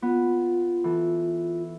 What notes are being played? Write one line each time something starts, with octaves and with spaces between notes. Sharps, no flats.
B3 F4
E3 A4